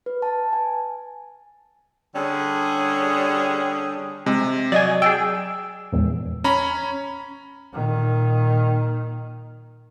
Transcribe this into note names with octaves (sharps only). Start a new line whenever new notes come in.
B4
A5
G#5
D3 G3 C#4 G#4
C3 G#3
F#3 D5 D#5 G#5
G#4 D5 G5 E6
A#1 E2 G#2
C#4 A#5 B5
A#2 D#3